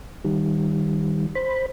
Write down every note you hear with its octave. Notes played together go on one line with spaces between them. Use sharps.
D#3 G3
C5 B5